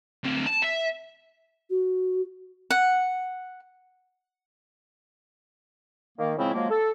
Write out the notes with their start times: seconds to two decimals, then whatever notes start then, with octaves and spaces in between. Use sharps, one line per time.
0.24 D2 C4
0.46 A5
0.62 E5
1.70 F#4
2.70 F#5
6.18 D#3 A#3
6.38 C#3 F3 G#3 C4 E4
6.54 F3 F#3 G#3 A#3
6.70 A4